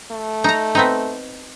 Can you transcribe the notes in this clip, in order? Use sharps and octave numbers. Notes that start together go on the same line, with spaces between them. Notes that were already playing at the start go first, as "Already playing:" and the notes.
A3
D#4 A#5
B3 C4 D#4